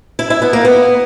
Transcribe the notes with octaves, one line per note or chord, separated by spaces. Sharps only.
E4
E4
B3
A#3
B3